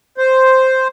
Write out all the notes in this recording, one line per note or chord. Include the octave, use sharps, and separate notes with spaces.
C5